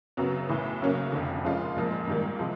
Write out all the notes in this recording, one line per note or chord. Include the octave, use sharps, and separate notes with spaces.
F#2 C#3 F#3 B3
B1 A2 E3
F#2 C#3 F#3 A#3 C#4
F1 F2 D3
A#2 F3 G#3 C#4 F4
A#1 G#2 F3 A#3
G#2 D#3 G3 A#3
C3 F3 G#3